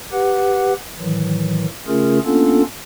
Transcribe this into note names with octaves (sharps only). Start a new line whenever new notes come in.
G4 B4 F#5
A2 D#3 E3 F#3
C#3 A3 C#4 F4 G#4 A#4
A#3 B3 C#4 D4 F4 A4